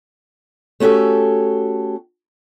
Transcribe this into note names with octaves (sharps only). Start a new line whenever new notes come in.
A3 C#4 F#4 G4 A4